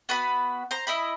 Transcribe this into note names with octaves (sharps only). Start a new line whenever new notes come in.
B3 F#4 B4 B5
C5 A#5
E4 D#5 B5